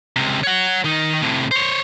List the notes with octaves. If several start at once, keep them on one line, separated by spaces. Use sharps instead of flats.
C#2 C3
C#5 F#5
D#3 D#4
A2 C3
C5 C#5